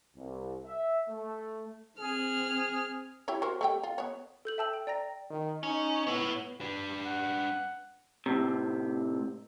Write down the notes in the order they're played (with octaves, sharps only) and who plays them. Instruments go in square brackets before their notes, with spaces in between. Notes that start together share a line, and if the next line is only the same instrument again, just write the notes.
[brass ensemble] C2
E5
A3
[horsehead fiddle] C4 [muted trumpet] G#4 [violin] F6
[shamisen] E4 G4 C#5
F#4 A#4 C5
A3 G4 G5
F4
B3 C#5
[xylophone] A4 G6 F#7
E5 G5 A5 E6 F#7
G5
D5 G5 A#5 A#6
[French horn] D#3
[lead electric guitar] C#4 [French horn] D#4
[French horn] B3 [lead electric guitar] E4 C#5
[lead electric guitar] D4 B4
[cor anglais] F#5
[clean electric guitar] A2 C3